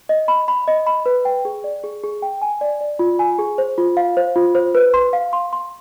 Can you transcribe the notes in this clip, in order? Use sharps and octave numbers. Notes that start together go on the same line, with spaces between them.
D#5
B5
B5
D#5
B5
B4
G5
G#4
D5
G#4
G#4
G5
G#5
D5
D5
F4
G#5
G#4
C5
F4
F5
C5
F4
C5
B4
C6
F5
C6
C6